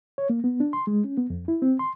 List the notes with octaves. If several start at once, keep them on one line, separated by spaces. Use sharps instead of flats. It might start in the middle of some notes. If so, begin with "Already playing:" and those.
C#5
A#3
B3
D4
C6
G#3
C#4
B3
F2
E4
C4
C6